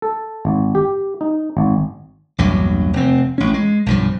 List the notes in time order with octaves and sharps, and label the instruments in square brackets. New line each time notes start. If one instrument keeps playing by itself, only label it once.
[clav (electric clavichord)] A4
G#1
G4
D#4
G#1
[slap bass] A#1 E2 G2 F#3
F1 C4
A1 C#4
G#3
B1 G2 F3